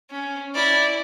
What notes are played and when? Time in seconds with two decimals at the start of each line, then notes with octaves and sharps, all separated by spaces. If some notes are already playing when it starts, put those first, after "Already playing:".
0.11 C#4
0.55 E4 D5